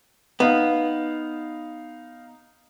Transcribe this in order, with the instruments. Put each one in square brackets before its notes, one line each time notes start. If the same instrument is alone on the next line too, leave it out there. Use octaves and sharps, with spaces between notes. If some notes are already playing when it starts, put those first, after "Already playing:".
[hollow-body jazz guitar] B3 [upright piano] D#4 F5